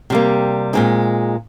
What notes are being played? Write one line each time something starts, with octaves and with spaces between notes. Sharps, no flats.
C3 G3 A#3
A#2 G#3 C4 D#4